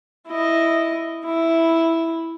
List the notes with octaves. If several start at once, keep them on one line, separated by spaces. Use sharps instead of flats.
E4 D#5
E4